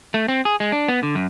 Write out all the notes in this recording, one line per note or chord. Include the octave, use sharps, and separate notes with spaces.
A3
C4
G#4
G#3
D4
B3
D3
F#2